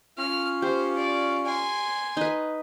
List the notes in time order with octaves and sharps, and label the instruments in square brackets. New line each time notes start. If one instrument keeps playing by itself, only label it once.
[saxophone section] C#4 F4 [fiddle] F6
[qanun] G4 [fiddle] C5
[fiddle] D5
G#5 C6
[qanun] D#4 B4